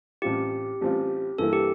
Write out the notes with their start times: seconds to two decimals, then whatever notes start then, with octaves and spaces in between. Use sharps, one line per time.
0.22 A1 A2 G3 C4 F4 G4
0.81 A1 A2 G3 C4 F4
1.38 G2 E3 A#3 E4 A4
1.53 G4